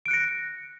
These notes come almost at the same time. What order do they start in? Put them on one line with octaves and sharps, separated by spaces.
D7 F#6 C#7 A#6